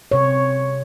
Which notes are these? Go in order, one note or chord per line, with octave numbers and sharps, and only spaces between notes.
C3 C#5